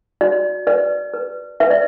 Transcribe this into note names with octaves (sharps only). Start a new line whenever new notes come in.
F#4 D5
B4 D5
B4
B4 E5
D5